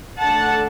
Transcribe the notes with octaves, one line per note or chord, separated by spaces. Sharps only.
D3 A3 D4 F#5 A5